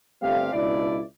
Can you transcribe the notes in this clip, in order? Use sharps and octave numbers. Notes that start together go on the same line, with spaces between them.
G1 G3 A3 C4 G4 F5
C#2 B2 D4 E4 D5